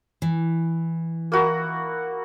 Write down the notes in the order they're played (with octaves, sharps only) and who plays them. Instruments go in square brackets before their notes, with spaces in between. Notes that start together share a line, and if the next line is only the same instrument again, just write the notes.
[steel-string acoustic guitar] E3
[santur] A#3 E4 F#4